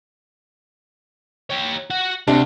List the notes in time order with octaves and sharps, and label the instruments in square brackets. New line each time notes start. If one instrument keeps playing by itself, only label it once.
[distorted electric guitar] G4 C#5
F#4 F#5
[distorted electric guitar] D2 [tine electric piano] C3 [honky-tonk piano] D4